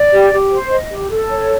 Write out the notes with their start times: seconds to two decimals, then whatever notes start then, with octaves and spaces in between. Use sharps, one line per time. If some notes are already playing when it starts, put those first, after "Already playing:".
Already playing: D5
0.12 G4
0.32 G4
0.52 C5
0.71 D#5
0.91 G4
1.11 A4
1.30 C#5